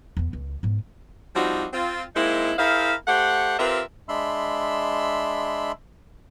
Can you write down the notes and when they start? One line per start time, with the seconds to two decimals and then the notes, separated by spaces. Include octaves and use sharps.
0.17 E2 B3
0.33 C#2
0.63 G#2 B3
1.36 F3 G3 C4 D4 D#4 F#4
1.73 C4 F4
2.16 G#3 A#3 C4 D#4 E4
2.59 E4 G#4 A#4 C5 E5 F5
3.07 A3 G4 C5 F#5
3.59 C4 F4 G4 A#4 B4 E5
4.09 G#3 D4 E5 B5 C6 E6